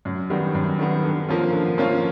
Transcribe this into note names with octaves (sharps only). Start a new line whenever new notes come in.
F#2
D#3 G3 B3
F#2
D#3 G3 B3
D3
F3 A#3 C#4 F4
D3
F3 A#3 C#4 F4